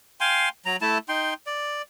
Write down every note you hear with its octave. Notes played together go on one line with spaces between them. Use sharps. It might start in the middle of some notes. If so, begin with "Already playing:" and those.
F5 G5 G#5 C6
F#3 A#5
A3 E4 A5
D#4 G5 C6
D5